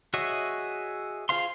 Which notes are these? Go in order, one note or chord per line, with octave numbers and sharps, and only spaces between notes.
F#4 G#4 C#5 D#5 E5
F4 G#4 C5 F5 C6